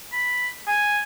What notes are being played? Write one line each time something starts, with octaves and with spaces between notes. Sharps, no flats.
B5
G#5